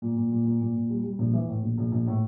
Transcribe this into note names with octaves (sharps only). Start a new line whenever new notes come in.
A#2
A#2
A#2
A#2
A#2
A#2
G3
G3
A#1
E3
A2
A#1
A#1
A#1
A2